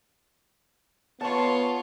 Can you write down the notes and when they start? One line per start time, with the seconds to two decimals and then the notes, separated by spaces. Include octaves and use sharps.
1.21 B3 F4 C#5 A5 C#6